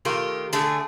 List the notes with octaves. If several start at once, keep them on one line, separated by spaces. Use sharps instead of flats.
D#3 A3 F4 G4
D3 A3 D4 G#4